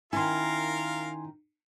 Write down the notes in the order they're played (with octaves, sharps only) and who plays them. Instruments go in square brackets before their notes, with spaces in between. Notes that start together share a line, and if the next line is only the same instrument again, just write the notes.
[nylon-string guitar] D#3 C#4 E4 [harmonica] F4 A#4 F5 [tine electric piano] G#5 C6